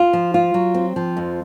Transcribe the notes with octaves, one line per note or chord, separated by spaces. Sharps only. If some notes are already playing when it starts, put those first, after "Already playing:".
Already playing: F4
F3
F4
F#3
C4
F3
F2